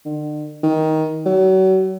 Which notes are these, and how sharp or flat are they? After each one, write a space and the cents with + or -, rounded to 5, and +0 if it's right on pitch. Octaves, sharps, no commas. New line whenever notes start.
D3 +45
D#3 +15
F#3 +35